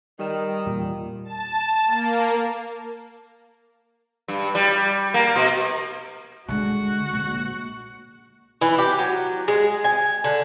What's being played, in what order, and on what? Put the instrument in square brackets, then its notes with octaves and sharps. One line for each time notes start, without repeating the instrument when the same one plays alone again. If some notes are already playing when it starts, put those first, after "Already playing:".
[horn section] D#3 [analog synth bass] G3
[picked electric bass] E2 G3 [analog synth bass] A#2
[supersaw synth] A5
A#3
[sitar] G2
G3
A#3
B2
[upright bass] D3 G#3 [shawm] F#4
[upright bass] A#1 A#2
[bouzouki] E3
G4
F#3
G#3
G#5
D3